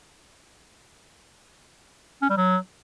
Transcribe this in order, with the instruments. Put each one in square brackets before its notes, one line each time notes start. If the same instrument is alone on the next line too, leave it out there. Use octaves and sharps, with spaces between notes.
[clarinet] C#4
G3
F#3